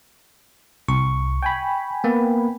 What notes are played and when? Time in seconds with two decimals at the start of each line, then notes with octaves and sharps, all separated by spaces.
0.88 C2 C#6
1.42 G5 G#5 B5
2.04 A#3 B3